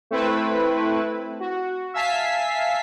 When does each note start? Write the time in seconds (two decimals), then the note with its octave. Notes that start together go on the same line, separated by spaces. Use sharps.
0.11 A3 C4 E4 B4
1.40 F#4
1.94 E5 F5 G#5 A5 B6 C7